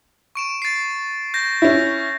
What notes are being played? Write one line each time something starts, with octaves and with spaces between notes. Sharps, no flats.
C#6 D7 E7
A6 C7
G6 A#6
C#4 E4